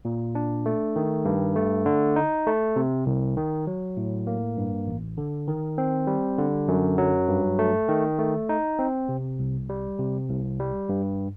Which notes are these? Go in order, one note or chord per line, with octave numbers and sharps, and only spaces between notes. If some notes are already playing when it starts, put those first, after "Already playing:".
A#2
D4
A3
D#3
G2
A3
D3
D#4
A3
C3
C2
D#3
F#3
A2
A#3
G2
A1
D3
D#3
C4
G3
D3
F#2
F#3
G2
A3
D#3
A3
D#4
C4
C3
C2
G3
C3
C2
G3
G2